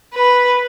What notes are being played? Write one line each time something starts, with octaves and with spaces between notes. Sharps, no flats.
B4